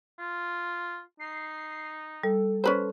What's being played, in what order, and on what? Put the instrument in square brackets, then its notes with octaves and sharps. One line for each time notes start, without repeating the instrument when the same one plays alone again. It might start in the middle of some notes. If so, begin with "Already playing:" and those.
[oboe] F4
[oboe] D#4 [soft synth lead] C7
[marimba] G3 [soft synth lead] A4
[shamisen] C#4 B4 C5